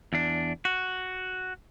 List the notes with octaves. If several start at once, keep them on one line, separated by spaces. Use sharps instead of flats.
E2 D4
F#4